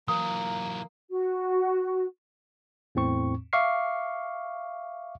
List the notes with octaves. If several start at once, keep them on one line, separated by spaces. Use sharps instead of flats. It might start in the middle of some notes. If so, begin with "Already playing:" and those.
E3 F#3 A#3 D#6
F#4
E2 A2 C4 C#6
E5 F5 C#6 D6 F6 C7